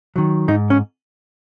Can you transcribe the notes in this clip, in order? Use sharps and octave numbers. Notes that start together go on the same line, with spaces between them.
D#3 F#3
G#2 D#4
C#4